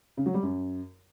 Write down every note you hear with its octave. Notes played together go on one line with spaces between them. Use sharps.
C#3
F#3
G3
F#2